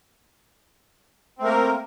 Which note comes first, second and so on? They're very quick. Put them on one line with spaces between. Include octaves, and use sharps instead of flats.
C4 A3 A#4 A#3